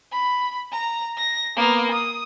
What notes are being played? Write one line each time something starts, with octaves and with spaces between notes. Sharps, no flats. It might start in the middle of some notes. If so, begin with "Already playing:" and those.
B5
A#5
A#6
A#3 B3
D#6